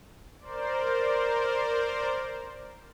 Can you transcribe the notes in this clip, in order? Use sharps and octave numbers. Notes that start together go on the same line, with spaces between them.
A#4 C5 D5